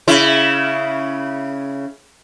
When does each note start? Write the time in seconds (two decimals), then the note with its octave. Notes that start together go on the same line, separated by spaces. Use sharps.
0.08 C#3 E4